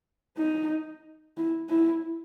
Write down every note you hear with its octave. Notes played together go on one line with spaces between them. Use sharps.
D#4
E4
E4